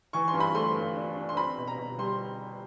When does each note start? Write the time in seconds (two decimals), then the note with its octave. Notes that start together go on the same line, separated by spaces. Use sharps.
0.13 E3 C#6
0.28 C6
0.33 G2
0.40 B5
0.55 A3 C6
0.75 G2
0.95 D4
1.16 D4
1.29 C6
1.36 C4 B5
1.58 B2
1.67 A#5
1.78 B2
1.98 G3 C6